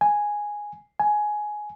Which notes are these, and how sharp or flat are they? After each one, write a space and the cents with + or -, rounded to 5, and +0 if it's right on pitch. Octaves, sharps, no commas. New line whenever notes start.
G#5 -5
G#5 +10